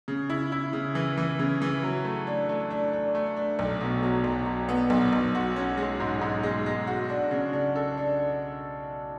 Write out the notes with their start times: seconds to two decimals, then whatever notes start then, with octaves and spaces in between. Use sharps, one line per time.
0.08 C#3
0.30 E4
0.52 E4
0.73 C#3
0.95 E3
1.17 E3
1.39 C#3
1.62 E3
1.83 F#3
2.05 A3
2.27 D4
2.49 A3
2.70 D4
2.93 D4
3.15 A3
3.36 D4
3.59 B1
3.80 B2
4.03 F#3
4.24 B1
4.46 F#3
4.69 B3
4.90 B1
5.13 B1
5.35 F#4
5.56 C#4
5.77 G#3
6.00 G#2
6.21 G#2
6.43 G#3
6.66 G#3
6.87 F#4
7.09 D4
7.31 C#3
7.53 D4
7.76 A4
7.97 D4